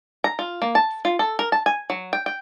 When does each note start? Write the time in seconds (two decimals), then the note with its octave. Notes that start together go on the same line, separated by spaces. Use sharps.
0.24 A#5
0.39 F4
0.62 A#3
0.75 A5
1.05 F4
1.19 A4
1.39 A#4
1.52 A5
1.66 G#5
1.90 F#3
2.13 G5
2.26 G5